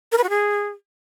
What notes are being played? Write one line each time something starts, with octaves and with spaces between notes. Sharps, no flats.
A#4
B4
F#4
G#4